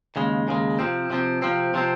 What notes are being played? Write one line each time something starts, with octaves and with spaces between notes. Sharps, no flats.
D#2 C#3 G#3
D#2 C#3 G#3
C3 F3 C4
C3 F3 C4
C3 F3 C4
C3 F3 C4